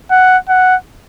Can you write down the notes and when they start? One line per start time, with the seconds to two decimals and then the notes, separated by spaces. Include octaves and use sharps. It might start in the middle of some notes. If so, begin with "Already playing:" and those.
0.11 F#5
0.49 F#5